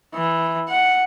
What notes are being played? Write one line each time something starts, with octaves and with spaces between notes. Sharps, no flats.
E3
F#5